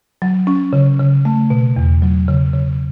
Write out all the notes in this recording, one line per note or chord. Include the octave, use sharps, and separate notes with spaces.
F#3
C#4
C#3
C#3
A3
B2
E2
F#3
C#3
C#3